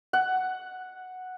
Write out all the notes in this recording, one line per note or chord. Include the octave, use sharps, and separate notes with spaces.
F#5